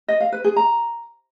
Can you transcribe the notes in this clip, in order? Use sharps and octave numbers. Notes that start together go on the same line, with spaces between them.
D#5
F5
B4
G#4
A#5